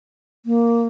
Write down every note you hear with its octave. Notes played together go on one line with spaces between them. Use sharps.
A#3